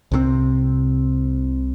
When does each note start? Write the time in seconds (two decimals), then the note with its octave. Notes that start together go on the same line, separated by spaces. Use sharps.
0.12 C2 C3 F3 C4